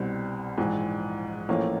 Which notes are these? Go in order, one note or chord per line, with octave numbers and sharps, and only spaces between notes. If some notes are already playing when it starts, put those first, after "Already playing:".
Already playing: C2 B2 G3 C4
A#1 G#2 E3
A1 A2 F3 A#3 C#4